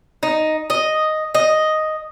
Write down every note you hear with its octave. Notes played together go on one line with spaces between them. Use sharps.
D#4
D#5
D#5